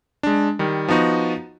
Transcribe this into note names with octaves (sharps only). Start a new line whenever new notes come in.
G#3 D4
D#3 G3
F3 B3 D#4 F#4